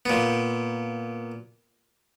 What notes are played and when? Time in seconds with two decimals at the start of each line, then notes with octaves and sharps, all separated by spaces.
0.06 A#2 B3